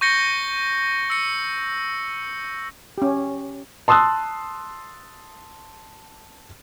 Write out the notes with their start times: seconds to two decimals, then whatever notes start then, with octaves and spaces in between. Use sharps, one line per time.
0.01 C#6 G6 A#6 C#7 G7
1.10 E6 C#7 G7
2.98 C#4 G4
3.88 A5 C6 D#6 E6 F#6